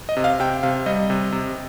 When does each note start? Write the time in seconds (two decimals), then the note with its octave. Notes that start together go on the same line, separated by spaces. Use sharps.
0.09 D#5
0.17 C3
0.24 F5
0.40 C3 G5
0.63 C3 F5
0.86 G3 D#5
1.10 C3
1.32 C3